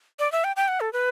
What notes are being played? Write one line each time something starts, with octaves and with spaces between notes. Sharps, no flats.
D5
E5
G5
G5
F#5
A4
B4